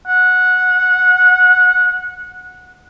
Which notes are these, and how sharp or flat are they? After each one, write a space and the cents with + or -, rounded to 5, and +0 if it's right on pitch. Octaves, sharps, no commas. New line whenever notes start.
F#5 -15